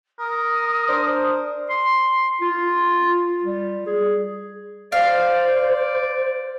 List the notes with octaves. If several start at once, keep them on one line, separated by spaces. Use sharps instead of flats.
A#4 D#6
D4 C5
C6
F4
G3
G#4
C5 D5 F5